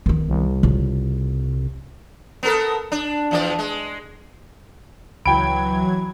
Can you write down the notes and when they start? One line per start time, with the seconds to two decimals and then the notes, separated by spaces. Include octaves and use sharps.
0.06 D#3 B3
0.28 C2
0.63 C#3 F4
2.43 B3 A4 A#4
2.92 D4
3.31 E2 F3 D5
3.59 G#3
5.26 C#2 E3 F#3 G5 B5 G#6 D7